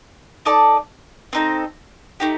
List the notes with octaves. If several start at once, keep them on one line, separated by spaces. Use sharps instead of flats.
D#4 A4 D5 A5
C4 D#4 A4
A3 D#4 G4